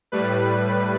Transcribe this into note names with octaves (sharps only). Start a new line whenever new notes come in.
A2 G3 B4